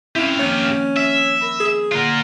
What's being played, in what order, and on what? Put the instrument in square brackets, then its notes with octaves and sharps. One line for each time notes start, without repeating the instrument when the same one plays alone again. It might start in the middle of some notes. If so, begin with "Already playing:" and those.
[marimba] C4 C#4 [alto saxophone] E4 [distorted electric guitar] G4 F5
[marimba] D#3 F3 A#3 [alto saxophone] C#4
[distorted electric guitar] E5
[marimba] A#4 B5
[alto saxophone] G#4
[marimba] D3 A#3 F#5 [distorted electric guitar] F4 A#4